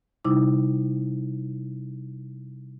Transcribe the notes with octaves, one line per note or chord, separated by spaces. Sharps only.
C3 G3 D#4 E4 D6